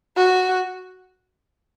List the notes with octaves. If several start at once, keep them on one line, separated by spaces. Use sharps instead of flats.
F#4